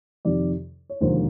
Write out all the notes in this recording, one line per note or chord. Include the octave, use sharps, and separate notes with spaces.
F2 C3 D#3 D5
C#5
E1 D#2 D3 F3 A#3 C5